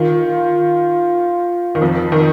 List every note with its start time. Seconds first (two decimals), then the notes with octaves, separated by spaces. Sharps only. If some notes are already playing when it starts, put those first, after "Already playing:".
Already playing: D#3 F4
1.75 D#3
1.81 F2 F3
2.12 D#3